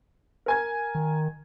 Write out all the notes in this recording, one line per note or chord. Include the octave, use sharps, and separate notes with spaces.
A#4 G#5 G#6
D#3